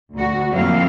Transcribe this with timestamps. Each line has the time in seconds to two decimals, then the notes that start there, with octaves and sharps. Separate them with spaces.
0.14 D2 F#4
0.51 F2 F3 A#3 C4 E4 F5